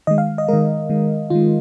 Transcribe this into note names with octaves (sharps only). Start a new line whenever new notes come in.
D#3 G#3 D#5
F5
D#5
D#3 G#3 A#4
D#3 G#3
D#3 G#3 F4